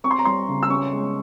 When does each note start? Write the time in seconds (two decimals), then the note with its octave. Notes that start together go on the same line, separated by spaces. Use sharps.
0.04 C4 C#6
0.11 C6
0.19 A#5
0.25 G3 C6
0.48 C#3
0.63 E6
0.69 C#4 C#6
0.92 G#3